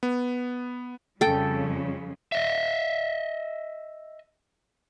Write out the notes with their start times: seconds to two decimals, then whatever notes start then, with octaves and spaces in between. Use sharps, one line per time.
0.03 B3
1.21 F2 C#3 G3 A4 G5
2.32 D#5 E5